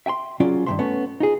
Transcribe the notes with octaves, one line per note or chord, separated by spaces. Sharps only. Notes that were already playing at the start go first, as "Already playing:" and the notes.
E5 G5 G#5 C6
C#3 F#3 C#4 F4 D5
G2 D#3 F#3 A3 E5 C6
A3 B3 C#4
D#4 F4 G#4